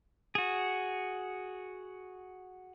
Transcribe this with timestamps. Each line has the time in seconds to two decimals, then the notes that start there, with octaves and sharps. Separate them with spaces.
0.35 F#4 G#4